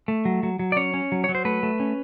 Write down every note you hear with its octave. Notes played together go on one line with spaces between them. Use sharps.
A3
F#3
F#3
F#3
D5
C#4 C#5
C#4
F#3
C#5
F#3
C5
A3 B4
A3
C#4